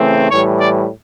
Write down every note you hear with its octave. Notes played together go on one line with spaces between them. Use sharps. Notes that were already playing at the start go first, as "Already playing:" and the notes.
Already playing: C#3 E3 A3 C4
A2 E3 G3 C#5
D5